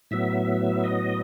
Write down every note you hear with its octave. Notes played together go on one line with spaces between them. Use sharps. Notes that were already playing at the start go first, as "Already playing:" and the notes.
A2 F#3 B3 E5
D#5